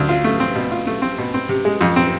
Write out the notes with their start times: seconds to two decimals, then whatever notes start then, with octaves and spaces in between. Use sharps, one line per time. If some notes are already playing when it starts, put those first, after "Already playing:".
Already playing: D2
0.09 F4
0.24 A3
0.40 C4
0.55 B2
0.71 F4
0.87 A3
1.02 C4
1.18 B2
1.34 C4
1.49 C3
1.65 G#3
1.81 F2
1.96 C4